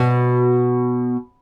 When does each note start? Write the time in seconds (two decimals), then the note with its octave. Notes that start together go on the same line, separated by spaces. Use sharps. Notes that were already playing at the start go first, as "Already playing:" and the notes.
Already playing: B2